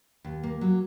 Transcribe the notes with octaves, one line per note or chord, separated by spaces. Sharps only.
D#2
A#3
F#3